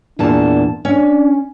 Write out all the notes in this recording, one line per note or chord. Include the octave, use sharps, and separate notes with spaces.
E2 A#2 D4 A5
C#4 D4